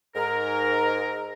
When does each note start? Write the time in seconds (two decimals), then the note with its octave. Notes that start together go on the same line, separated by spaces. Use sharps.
0.15 G#2 A#4